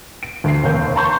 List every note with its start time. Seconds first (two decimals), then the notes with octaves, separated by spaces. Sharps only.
0.23 D7
0.44 D2 C7
0.63 F1 D#2 A#3 G6
0.96 A5 A#5 C6 C#6 G6